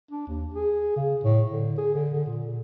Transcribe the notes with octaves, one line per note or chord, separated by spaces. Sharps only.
D4
D#2
G#4
C#3
A2
D3
G#4
D3
D3
A#2